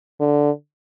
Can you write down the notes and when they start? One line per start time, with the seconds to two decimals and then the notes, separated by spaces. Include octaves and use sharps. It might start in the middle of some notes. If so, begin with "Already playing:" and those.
0.20 D3